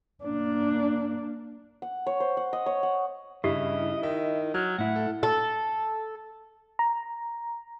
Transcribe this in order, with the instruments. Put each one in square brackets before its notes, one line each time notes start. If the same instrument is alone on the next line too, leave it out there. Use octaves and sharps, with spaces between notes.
[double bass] A#3 D4
[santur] F#5
C#5
C5
F#5
D#5
C#5
F#5
[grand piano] G2 C#3 [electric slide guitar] E4 [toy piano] G4 [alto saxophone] D#5
[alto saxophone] D#3 [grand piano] D#5 E5
[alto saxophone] F#3 [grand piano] F6
[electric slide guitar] A2 E4 [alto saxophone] F#5
[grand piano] A4
[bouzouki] A4
[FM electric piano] A#5